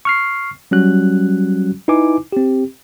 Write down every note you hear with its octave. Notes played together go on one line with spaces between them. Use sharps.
C#6 F6 C7
F#3 G3 C#4 F#4 F#6
D#4 E4 B4 G#5 D6
C4 G4